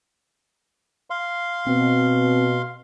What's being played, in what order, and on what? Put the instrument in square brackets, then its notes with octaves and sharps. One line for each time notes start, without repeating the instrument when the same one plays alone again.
[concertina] F5 C6
[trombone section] B2 [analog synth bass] C4